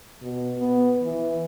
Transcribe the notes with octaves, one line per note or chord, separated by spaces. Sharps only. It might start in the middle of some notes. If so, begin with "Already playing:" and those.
B2
B3
E3